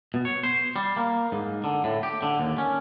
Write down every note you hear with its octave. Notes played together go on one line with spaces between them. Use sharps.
B2
C#5
C5
G3
A#3
G#2
D3
A2
G4
D3
D#2
C#4